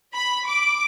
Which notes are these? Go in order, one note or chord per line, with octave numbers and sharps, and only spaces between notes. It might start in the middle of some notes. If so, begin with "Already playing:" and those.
B5
D6